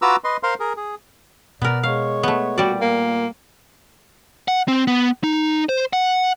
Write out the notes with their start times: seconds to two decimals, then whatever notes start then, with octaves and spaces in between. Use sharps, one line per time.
0.02 F4 F#4 B4 A#5 D6 E6
0.24 B4 D#5 C6
0.43 A#4 C5 F5 C6
0.60 G#4 A#4
0.77 G#4
1.62 B2 B3 A#4 D5
1.83 G#3 C#5 F5
2.23 A3 B3
2.58 A#2 G3 F#4 D5
2.81 A#3
4.48 F#5
4.68 C4
4.87 B3
5.24 D#4
5.69 C5
5.93 F#5